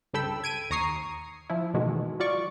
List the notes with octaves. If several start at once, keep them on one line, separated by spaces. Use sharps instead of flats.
C#2 G2 A4 G5 B5 E6
G#6 D7 D#7
D#2 A#5 C#6 D#6 C7
F3 E4
B2 D#3 E3 G#3 A3 F#4
F#3 F4 D5 C#6